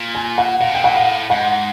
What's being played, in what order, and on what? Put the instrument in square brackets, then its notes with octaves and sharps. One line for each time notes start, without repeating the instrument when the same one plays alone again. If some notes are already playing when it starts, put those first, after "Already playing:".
Already playing: [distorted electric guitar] A#2
[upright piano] G#5
F#5
[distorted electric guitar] A#2 [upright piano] F5
[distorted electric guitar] B2
[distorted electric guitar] A#2 [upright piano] G5
[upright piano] F#5
[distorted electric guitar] A2 [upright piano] F5
[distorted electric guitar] G#2 [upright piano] F#5